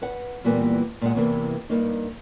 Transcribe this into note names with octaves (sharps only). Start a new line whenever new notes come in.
B4 F#5
A#2 E3 G3 A#3 B3
A#2 G#3 F#5
E2 C3 E3 A#3
G2 A#3 D#4